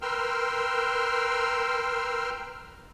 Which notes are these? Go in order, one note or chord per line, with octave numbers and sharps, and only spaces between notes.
A#4 B4 G5 C6 E6 F6